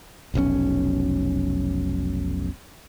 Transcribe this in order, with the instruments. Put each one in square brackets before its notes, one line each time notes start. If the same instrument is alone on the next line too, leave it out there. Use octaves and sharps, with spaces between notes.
[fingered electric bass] F1 B1 A#2 C#4